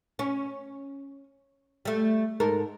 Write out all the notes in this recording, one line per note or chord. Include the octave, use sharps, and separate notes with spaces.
C#4
G3 A3
G#2 A4 A#4